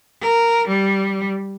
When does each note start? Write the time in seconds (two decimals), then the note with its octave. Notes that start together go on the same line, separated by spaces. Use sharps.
0.22 A#4
0.68 G3